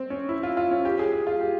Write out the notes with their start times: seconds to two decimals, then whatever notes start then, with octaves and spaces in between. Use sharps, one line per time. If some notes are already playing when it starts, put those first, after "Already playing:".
Already playing: C4
0.10 C#4
0.29 E4
0.43 F4
0.57 F4
0.71 C#4
0.85 G4
0.99 G#4
1.13 G#4
1.27 F4
1.41 G4